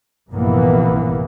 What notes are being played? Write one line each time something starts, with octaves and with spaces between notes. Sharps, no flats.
A#1 G2 C3 E3 A#3 B3